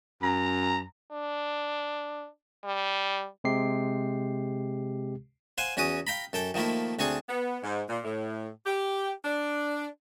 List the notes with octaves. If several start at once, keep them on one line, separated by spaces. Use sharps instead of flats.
F#2 A#5
D4
G3
C3 G#3 G4 C7
C5 F5 F#5 G#5
E2 C#4 F#4 D6 D#6
F5 G5 A#5 B5
F#2 A4 G5 D6
D#3 F3 A3 A#3 E4
D2 C4 D4 G#4 C#6
B3
G#2
A#2
A2
G4
D4